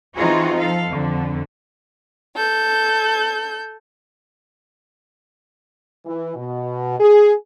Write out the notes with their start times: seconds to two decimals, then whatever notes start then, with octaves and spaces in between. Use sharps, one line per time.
0.15 E3 C4 D#4 F4 F#4 G#4
0.56 F3 A4 F5
0.87 F2 D3
2.37 A4 G6
6.06 E3
6.36 B2
7.00 G#4